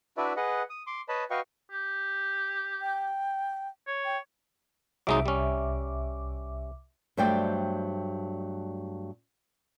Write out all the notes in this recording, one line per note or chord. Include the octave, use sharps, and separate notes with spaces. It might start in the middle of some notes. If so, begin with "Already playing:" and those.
D4 E4 F#4 B4 D5 E5
G#4 B4 D#5 F#5
D#6
C6 D6
B4 C#5 D#5 A5 B5
F#4 B4 D#5 F5 G5 C#6
G4
G5
C#5
G5
C2 F#3 G#3 D#4 E5 D6
G3 C#4
G2 F#3 A3 C5 D5 G5